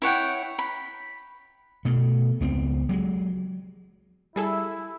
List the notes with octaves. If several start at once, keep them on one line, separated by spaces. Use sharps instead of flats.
E4 C#5 F#5 G5
B5
B2 A3
C#2 B3 C4
F#3 G#3
G3 E4 G#4 A4